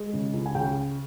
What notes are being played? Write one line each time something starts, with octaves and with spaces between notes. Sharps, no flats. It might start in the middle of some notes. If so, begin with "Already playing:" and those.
Already playing: G#3
C#3
C#2
G#5
C#3 G5